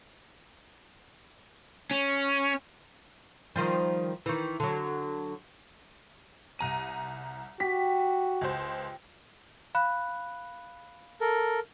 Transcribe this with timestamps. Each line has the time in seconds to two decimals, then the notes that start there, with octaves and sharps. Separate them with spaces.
1.91 C#4
3.56 D#3 F3 G3
4.26 D#3 E3
4.60 D3 F#3
6.59 C2 A#5 D#7
7.60 F#4 G4 B6
8.41 C#2 C5
9.75 F5 B5 F#6
11.21 A4 A#4